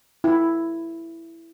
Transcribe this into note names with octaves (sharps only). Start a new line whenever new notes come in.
E4